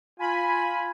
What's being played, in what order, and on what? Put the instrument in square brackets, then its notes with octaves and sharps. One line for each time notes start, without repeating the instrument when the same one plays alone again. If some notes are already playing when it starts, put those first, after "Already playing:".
[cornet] F4 [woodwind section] G#5 [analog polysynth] B5